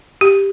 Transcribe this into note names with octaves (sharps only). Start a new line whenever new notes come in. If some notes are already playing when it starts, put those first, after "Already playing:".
G4